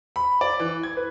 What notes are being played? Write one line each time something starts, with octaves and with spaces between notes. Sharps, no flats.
B5
D5
E3
G#6
B4